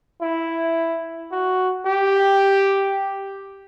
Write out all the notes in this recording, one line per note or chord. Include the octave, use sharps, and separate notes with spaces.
E4
F#4
G4